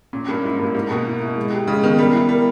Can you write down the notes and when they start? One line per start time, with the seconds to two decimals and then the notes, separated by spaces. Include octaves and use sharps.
0.13 A#2 C#4
0.28 G2 A#3
0.44 G#2 E4
0.59 G2 A#3
0.74 G#2 A#3
0.90 B2 A#3
1.06 E4
1.21 E4
1.37 G#3
1.53 G4
1.67 C#3 G#3
1.83 D#3 B3
1.98 G3 A#4
2.13 E4
2.29 G3 A#4